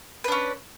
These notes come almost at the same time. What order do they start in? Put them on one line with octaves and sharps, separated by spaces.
B4 D4 C#4